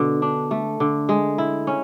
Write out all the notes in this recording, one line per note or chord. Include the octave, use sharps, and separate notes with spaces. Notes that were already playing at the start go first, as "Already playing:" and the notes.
Already playing: B2 D3
D4
A3
D3
G#3
E4
C#4